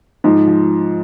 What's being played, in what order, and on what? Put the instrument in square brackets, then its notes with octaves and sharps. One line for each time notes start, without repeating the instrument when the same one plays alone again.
[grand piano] G#2 [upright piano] F3
[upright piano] F3